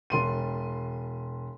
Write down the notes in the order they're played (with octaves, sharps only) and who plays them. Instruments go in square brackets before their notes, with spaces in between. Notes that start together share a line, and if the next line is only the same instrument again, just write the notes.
[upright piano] E1 C6 D#7